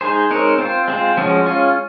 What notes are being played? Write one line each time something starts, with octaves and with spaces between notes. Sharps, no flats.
G#3 D#4 G#4 C5
G#3 C4 D#4 A#4 C#5
C4 F4 C5
G#3 C4 F4
F3 G#3 C#4 F#4
G#3 C#4 F4